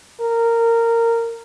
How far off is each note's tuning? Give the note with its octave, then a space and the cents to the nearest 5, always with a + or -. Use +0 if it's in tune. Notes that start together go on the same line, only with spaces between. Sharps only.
A#4 -15